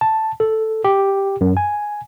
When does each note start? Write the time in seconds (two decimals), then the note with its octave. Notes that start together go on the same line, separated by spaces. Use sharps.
0.01 A5
0.40 A4
0.84 G4
1.41 F#2
1.57 G#5